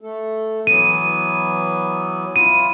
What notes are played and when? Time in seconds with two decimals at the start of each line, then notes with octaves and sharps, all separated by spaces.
0.01 A3 A4
0.67 E3 F#3 B3 D#7
2.36 E4 F4 D#7